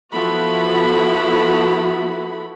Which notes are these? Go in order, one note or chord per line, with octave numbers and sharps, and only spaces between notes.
F3 B3 E4 F#4 A4 B5